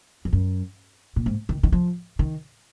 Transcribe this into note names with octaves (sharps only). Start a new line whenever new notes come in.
F2
F#2
A#2
G#2
D#3
D#3
F3
D#3